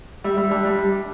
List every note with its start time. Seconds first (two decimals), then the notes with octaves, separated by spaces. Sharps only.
0.24 G3 E5
0.37 G3
0.51 G3 D4
0.65 G3